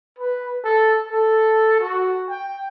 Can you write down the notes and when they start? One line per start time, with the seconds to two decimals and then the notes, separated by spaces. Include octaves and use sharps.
0.18 B4
0.64 A4
1.08 A4
1.80 F#4
2.29 G5